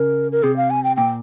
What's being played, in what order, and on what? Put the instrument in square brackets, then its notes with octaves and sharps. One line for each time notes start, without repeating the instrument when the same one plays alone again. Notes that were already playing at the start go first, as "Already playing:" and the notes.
Already playing: [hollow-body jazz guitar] C#3 [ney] A#4
[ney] A#4
[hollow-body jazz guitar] C3 [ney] G#4
[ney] F5
G#5
G5
[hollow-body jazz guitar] A#2 [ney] G5